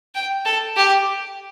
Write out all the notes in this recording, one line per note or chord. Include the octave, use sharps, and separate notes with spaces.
G5
A4
G4